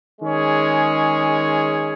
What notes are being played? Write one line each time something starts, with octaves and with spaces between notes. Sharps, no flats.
D#3 G#3 C#4 G#4 C#5